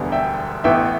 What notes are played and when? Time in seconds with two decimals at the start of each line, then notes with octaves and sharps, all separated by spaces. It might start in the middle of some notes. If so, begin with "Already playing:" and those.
Already playing: E1 D2 D3 G3 B3
0.12 E5 G5
0.64 A1 A2 E3 B3 E5 G5